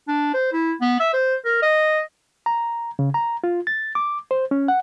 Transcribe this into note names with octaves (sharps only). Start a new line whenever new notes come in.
D4
C5
E4
B3
E5
C5
A#4
D#5
A#5
C#3
A#5
F4
A6
D6
C5
C#4
F#5